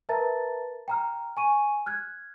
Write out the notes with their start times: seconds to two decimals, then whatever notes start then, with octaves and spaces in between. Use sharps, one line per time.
0.09 A#4 B4 E5 A5 A#5 A6
0.88 G5 A#5 F6
1.37 G#5 C#6 D#7
1.86 F6 F#6 G#6